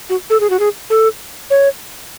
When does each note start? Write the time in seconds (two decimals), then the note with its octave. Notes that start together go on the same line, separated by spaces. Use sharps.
0.10 F#4
0.30 A4
0.40 G#4
0.50 F#4
0.59 G#4
0.90 A4
1.50 C#5